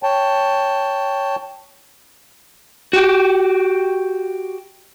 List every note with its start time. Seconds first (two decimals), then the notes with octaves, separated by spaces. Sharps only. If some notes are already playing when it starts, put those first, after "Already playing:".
0.03 C#5 G5 A5
2.93 F#4 G4